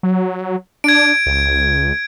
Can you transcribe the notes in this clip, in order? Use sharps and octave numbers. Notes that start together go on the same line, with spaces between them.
F#3
D4 G#6 D7
C#2